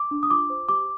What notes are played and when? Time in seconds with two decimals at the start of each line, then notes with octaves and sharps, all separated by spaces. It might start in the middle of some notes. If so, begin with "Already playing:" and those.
Already playing: D6
0.11 D4
0.23 D#6
0.31 F4 D6
0.50 C5
0.69 G4 D6